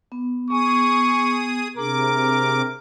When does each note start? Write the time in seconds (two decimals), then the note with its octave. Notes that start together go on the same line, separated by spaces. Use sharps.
0.12 B3
0.50 B3 G#4 G#5 C#6 D#6
1.77 C3 D4 G#4 A#4 A#5 D6